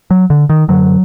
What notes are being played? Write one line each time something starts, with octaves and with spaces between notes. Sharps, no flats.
F#3
D3
D#3
F#2 D3 F#3